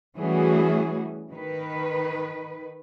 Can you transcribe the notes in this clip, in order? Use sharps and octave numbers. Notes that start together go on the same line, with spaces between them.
E3 G3 A3 C#4 F#4 G#4
D#3 B4